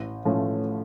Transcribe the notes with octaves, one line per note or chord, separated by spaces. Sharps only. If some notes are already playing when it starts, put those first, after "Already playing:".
Already playing: A1
A2 F3 A3 C#4